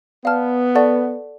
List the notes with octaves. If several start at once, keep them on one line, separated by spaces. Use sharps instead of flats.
B3 D5 F5 A5 F6
A4 D5 F#5 A5 C#6